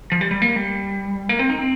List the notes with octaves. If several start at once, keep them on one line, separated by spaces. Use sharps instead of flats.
F3
G3
G3
A#3
G3
A#3
C4
D#4
C4